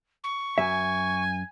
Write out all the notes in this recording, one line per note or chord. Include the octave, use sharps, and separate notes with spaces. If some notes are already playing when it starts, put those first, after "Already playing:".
C#6
F#2 E5 G#5